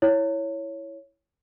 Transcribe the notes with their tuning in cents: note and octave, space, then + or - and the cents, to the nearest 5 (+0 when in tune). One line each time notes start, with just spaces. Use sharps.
E4 +0 C#5 +0